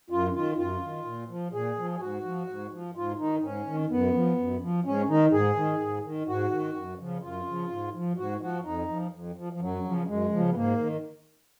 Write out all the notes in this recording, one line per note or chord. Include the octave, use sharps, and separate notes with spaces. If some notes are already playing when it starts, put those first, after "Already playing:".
F#2 F4
D#3 F4
F#2 F4
D#3
A#2
F3
A#2 G#4
F3
G#4
G#2 F#4
F3
G#2
F3
G#2 F4
D#3 D#4
G#2 C#4
D#3
F#2 B3
F3
F#2
F3
G#2 C#4
D#3 D#4
G#2 G#4
D#3
G#2
D#3
G#2 F#4
D#3
F#2
C#3 F3
F#2 F4
C#3 F3
G#2
F3
G#2 F#4
F3 F#4
F2 D#4
F3
F2
F3
F3
F#2 F#3
C#3 F3
F#2 G#3
C#3 F3
B3
G#2 A#3
D#3